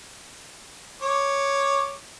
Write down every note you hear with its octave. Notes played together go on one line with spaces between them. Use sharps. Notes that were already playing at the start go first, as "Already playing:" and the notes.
C#5 D6